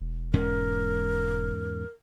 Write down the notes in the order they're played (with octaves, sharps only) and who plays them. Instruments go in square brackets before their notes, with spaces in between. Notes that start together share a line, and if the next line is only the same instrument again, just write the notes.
[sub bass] E1
[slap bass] E2 G#2 C#4 [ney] A#4